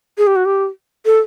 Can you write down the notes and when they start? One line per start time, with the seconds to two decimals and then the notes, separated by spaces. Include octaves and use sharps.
0.18 G#4
0.27 G4
0.36 F#4
0.45 G4
1.06 A4